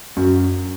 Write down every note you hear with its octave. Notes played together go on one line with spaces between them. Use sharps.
F#2 F#4